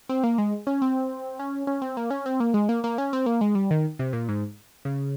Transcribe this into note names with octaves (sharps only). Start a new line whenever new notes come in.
C4
A#3
G#3
C#4
C4
C#4
C#4
C4
A#3
C#4
C4
A#3
G#3
A#3
A#3
C#4
C4
A#3
G#3
G3
D#3
C3
A#2
G#2
C#3